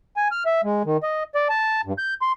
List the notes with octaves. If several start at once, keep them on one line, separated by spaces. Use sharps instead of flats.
G#5
F6
E5
G#3
D#3
D#5
D5
A5
G2
G6
C6